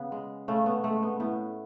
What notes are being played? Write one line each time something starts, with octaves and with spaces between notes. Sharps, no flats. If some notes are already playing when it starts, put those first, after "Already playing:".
Already playing: C#3 B3
G#3
C#3 A3 C#4
B3
G#3 A3
B3
A2 B3